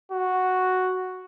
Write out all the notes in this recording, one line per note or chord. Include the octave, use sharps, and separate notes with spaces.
F#4